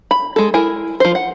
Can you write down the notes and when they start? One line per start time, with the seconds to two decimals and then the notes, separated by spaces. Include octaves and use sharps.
0.11 B5
0.36 G#3 A4
0.54 E4 A#4 G#5
1.00 F3 C5
1.15 F#5